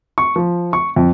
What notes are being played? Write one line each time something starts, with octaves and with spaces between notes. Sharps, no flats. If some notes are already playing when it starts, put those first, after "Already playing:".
C#6
F3
C#6
F2